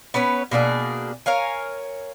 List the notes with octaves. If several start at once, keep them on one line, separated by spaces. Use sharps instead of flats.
B3 C#4 B4 C#5
B2 A#3 D4 G#4
A#4 C#5 F5 G#5